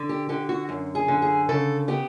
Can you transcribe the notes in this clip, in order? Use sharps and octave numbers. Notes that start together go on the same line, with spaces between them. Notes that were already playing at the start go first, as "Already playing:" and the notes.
Already playing: D3
G4
D3 G4
F#4
F#2
G#4
D3
G#4
C#3 A4
B3 G4